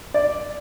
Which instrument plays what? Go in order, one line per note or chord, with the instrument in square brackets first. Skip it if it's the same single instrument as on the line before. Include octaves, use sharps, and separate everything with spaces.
[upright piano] D5